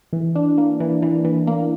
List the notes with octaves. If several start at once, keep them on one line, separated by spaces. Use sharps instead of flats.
E3
D4
A#3
E3
E3
E3
A#3